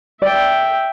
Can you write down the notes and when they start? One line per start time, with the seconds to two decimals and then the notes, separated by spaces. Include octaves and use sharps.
0.22 D5 E5 G5